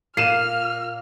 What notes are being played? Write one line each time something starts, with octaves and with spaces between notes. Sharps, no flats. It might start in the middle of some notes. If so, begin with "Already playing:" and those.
A#2 A#3 F6 C7 D#7 E7